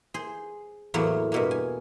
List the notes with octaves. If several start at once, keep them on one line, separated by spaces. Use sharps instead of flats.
G#4 C5
E2 A2 F#3 A#3 B3
G2 B2 A#3
G#5